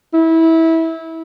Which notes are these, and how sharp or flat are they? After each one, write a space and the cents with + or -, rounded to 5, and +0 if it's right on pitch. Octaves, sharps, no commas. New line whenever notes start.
E4 -20